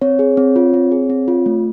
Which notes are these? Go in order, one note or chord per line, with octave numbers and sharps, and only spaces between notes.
C4 C#5
G#4
C4
F4
C4
G#4
C4
F4
A3